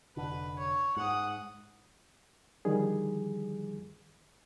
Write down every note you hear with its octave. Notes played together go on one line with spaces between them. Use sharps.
F1 D3 B4
C#5
G#2 F#5 D#6
D3 D#3 F3 G3 G#4